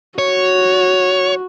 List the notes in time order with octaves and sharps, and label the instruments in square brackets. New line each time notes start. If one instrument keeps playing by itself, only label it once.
[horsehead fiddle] F#4 [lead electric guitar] C#5